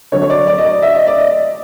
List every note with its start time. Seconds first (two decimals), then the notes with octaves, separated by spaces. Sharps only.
0.12 D3 F#3 C#5
0.22 C#5
0.30 D5
0.47 D5
0.58 D#5
0.65 D5
0.82 E5
0.95 D#5
1.07 D5
1.18 D#5